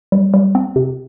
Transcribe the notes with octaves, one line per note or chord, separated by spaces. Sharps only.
G3
G3
C4
C3